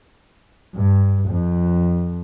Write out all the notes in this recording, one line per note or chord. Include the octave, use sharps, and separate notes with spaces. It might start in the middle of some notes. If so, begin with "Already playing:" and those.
G2
F2